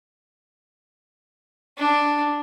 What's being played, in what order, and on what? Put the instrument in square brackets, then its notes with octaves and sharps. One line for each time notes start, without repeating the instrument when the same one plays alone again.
[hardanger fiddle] D4